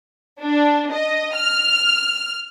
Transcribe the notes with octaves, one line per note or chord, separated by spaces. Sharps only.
D4
D#5
F6